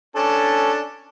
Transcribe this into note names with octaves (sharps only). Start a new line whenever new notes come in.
C#4 D4 A4